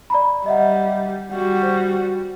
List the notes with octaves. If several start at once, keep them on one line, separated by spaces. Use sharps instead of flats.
D5 A#5 B5
G3 D#5 E5 F#5
G3 F#4 F#5
C5